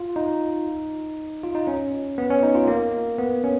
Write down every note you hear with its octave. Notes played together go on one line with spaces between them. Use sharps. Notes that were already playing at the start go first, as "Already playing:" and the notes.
Already playing: F4
D#4
F4
D#4
C#4
B3
C#4
D#4
F4
A#3
B3
C#4